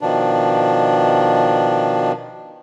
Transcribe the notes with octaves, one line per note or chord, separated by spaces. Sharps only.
B2 D#3 F3 D4